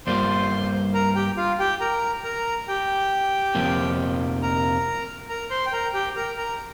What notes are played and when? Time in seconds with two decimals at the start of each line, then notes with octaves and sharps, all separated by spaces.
0.06 G2 G3 A#3 F4 C5 C6
0.94 A#4 A#5
1.15 G4 G5
1.37 F4 F5
1.59 G4 G5
1.80 A#4 A#5
2.24 A#4 A#5
2.68 G4 G5
3.55 F2 C3 F3 A#3
4.42 A#4 A#5
5.29 A#4 A#5
5.50 C5 C6
5.66 G5
5.72 A#4 A#5
5.94 G4 G5
6.16 A#4 A#5
6.37 A#4 A#5